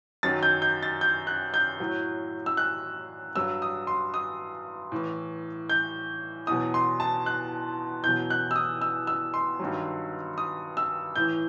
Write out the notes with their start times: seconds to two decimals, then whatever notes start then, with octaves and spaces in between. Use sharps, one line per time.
0.23 F#2 D#3 F#3 A6
0.43 G6
0.62 G6
0.83 A6
1.01 G6
1.27 F#6
1.54 G6
1.80 A2 F#3
2.46 E6
2.57 F#6
3.36 G2 F#3 E6
3.62 D#6
3.87 C6
4.14 D#6
4.92 A2 E3
5.69 G6
6.47 E2 B2 F#3 D#6
6.74 C6
7.00 A5
7.26 F#6
8.04 E2 B2 F#3 G6
8.30 F#6
8.51 E6
8.56 D#6
8.81 E6
9.07 E6
9.34 C6
9.60 G2 D#3 F#3
10.38 D#6
10.77 E6
11.16 A2 E3 G6